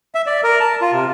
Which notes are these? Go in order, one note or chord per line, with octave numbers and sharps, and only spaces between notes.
E5
D5
A#4
A5
F4
C3